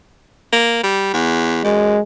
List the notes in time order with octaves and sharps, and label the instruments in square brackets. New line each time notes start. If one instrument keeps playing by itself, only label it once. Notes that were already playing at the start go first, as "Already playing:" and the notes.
[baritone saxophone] A#3
G3
E2
[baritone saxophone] F#2 [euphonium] G#3